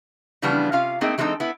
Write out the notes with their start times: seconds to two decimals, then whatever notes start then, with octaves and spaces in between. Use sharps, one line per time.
0.42 C#3 E3 F3 G3 B3 D4
0.72 C3 C#4 F4 F5
1.01 A3 A#3 C4 D#4 G#4
1.18 E3 G3 G#3 C4 D#4 A4
1.40 B3 E4